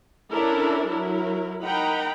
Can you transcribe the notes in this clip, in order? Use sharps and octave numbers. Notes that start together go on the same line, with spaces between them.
C#4 D4 E4 A4 A#4
F#3 E4 A#4
D#4 A#4 F#5 G5 A#5 B5